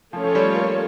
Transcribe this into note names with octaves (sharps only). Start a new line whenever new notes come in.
F3 A3 C#4 F4 A4 C#5
F3
G3
A#3